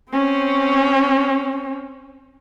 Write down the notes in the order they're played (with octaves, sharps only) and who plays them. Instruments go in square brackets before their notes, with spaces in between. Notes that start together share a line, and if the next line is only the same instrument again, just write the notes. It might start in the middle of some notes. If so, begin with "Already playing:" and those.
[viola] C4 C#4